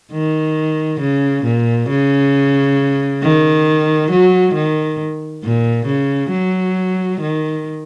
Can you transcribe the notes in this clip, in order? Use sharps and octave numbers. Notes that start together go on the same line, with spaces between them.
D#3
C#3
A#2
C#3
D#3
F#3
D#3
A#2
C#3
F#3
D#3